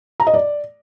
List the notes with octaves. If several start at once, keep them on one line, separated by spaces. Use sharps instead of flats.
A#5
D#5
D5